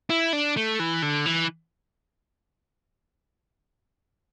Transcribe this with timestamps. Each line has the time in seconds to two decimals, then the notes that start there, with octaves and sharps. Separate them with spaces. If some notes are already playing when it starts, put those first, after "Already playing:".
0.10 E4
0.33 D4
0.57 A3
0.79 E3
1.02 D3
1.26 E3